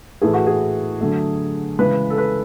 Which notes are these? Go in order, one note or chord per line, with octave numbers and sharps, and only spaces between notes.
A2 E3 A3 G#4
F#4
G#4
D3 F#3 A3
C#3 E3 G#3 B4
A4
B4